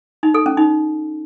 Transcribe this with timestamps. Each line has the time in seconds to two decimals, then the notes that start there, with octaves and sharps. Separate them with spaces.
0.23 D#4
0.34 A4
0.46 C#4
0.57 D#4